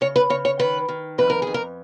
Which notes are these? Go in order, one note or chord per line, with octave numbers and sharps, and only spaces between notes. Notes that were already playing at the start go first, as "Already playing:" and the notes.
C#3 C#5
B4
C#3 C#5
C#5
D#3 B4
D#3
F2 B4
A#4
F2 G#4
A#4